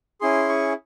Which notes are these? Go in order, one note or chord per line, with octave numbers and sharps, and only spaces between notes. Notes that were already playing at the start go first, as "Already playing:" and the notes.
C#4 E4 G#4 C6
C#6